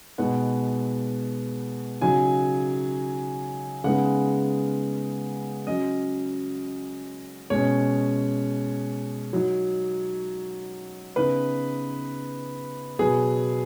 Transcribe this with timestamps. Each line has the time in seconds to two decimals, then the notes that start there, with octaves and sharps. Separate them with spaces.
0.18 B2 G#3 B3 D#4 F#5
2.01 C#3 F#3 D#4 G#5
3.84 C#3 G#3 B3 D#4 F#5
5.67 F#3 C#4 D#5
7.50 B2 G#3 C#4 C#5
9.33 F#3 D#4
11.16 C#3 B3 D#4 B4
12.99 B2 F#3 B3 G#4